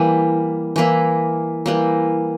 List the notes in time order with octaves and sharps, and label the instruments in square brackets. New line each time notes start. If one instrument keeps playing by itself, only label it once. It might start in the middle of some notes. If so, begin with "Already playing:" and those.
Already playing: [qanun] E3 G3 A#3 E4
E3 A#3 E4
E3 G3 A#3